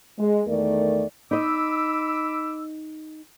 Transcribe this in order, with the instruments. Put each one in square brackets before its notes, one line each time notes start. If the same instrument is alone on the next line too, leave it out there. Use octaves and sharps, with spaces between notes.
[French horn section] G#3
E2 D#3 A3 A#4 D5
[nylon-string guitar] D#4 D#5 [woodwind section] B5 D6 E6